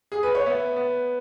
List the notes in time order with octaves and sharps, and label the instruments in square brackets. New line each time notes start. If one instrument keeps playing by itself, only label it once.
[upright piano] G#4
B4
C#5
B3 E5
B3